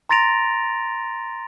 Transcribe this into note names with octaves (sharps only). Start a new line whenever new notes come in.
A#5 C6 A6 A#6 D7 F7